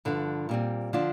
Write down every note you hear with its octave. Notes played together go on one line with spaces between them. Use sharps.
G2 D3 F3
A#2 G3 C4
D3 F3 D4 F4